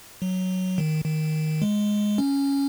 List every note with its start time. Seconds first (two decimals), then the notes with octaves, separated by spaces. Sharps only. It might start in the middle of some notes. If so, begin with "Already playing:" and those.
0.22 F#3
0.78 D#3
1.05 D#3
1.62 G#3
2.18 C#4